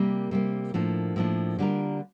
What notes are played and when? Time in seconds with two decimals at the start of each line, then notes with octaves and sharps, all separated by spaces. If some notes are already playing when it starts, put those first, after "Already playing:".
Already playing: C3 G3 A#3
0.31 C3 G3 A#3
0.74 A2 F3 A#3 D4
1.16 A2 F3 A#3 D4
1.59 D3 G3 D4 F4 A#4